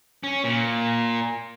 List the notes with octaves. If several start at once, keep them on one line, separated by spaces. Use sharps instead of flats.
C#4
A#2